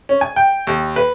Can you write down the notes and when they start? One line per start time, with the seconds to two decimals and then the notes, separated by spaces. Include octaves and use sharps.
0.09 C#4
0.21 G#5
0.36 G5
0.67 D#2
0.96 B4